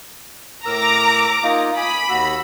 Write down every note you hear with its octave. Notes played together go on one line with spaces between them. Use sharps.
A2 A#4 A#5 D6 E6
A#3 D#4 F4
G#5 B5 D6 D#6
D#2 F#4 E6